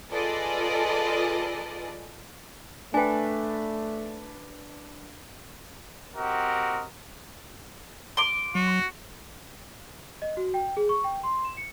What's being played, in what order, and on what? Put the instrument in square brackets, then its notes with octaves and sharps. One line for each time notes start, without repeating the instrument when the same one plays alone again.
[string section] F4 G#4 A4 B4 D5 D#5
[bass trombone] A3 [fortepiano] D4 B4 [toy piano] G5 G#5
[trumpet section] C4 F#4 G4 A#4 D#5
[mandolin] C6 D6
[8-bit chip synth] F#3 [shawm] F#4
[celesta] D#5
F#4
G5
G#4
C#6
G5
C6
E7
C#7